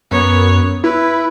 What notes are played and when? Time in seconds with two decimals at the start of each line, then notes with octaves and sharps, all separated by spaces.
0.11 F#2 B3 C#5
0.84 E4 B4